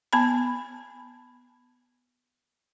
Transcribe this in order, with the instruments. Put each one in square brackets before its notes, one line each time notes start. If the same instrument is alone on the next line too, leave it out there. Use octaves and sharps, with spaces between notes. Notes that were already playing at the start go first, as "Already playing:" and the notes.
[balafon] B3 A5 B5